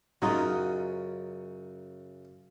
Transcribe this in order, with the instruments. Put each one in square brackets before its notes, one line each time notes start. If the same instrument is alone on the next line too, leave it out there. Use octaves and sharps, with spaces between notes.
[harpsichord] F#2 C#3 [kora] F#3 D#4 F4